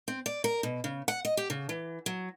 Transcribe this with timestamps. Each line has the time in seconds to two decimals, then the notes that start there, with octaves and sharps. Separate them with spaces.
0.08 C4
0.26 D5
0.44 A#4
0.63 B2
0.84 C#3
1.08 F#5
1.25 D#5
1.37 G4
1.50 C#3
1.69 E3
2.06 F#3